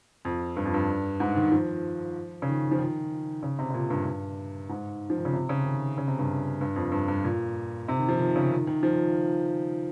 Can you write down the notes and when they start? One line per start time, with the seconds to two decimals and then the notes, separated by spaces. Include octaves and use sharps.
0.25 F2
0.57 G2
0.65 F2
0.74 G2
1.20 G#2
1.36 D#3
1.52 F3
2.42 C#3
2.48 D#3
2.71 F3
2.78 D#3
3.43 C#3
3.59 C3
3.70 C3
3.74 A#2
3.90 G2
4.06 G2
4.69 G#2
5.10 F3
5.18 D#3
5.25 C#3
5.33 C3
5.49 C#3
5.65 D#3
5.98 C#3
6.08 C3
6.19 G2
6.61 G2
6.76 F2
6.92 G2
7.08 G2
7.24 A#2
7.88 C3
7.99 D#3
8.09 F3
8.19 D#3
8.36 C#3
8.51 D#3
8.67 D#3
8.83 F3